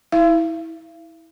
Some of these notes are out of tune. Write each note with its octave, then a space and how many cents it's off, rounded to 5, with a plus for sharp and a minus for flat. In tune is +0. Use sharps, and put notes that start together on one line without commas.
E4 -25 F5 -45